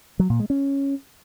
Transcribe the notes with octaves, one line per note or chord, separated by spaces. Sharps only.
F#3
A#2
G#3
C#4